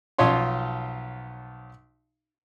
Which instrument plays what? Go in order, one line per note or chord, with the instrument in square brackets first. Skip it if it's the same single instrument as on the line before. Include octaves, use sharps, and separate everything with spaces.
[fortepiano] B1 F3 F4 C#5 C6